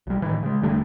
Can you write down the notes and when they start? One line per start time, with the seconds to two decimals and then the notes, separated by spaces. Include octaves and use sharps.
0.07 B1 G3
0.22 A2 D#3 E3
0.43 C#3 G#3
0.62 E1 D3 G3 A3